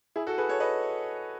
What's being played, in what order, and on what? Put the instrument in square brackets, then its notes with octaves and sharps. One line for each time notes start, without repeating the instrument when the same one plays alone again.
[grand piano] E4 G#4
F#4 A4
G#4 B4
A4 C#5
B4 D#5